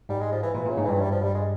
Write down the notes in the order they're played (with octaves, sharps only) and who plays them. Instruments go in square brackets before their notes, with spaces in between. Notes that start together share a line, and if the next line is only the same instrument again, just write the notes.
[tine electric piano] G#2 [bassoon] G3
[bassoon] G#3
F3
E3
[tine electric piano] A#2 [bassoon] E3
[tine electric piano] A#2
[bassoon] C#3
[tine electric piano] G#2
[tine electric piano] G2 [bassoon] E3
[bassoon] G3
F3
G3
G#3